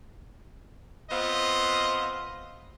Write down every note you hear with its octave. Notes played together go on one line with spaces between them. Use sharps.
B3 C4 F4 B4 D#5